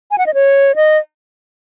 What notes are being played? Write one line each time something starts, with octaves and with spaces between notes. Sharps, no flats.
G#5
F#5
D#5
C#5
D#5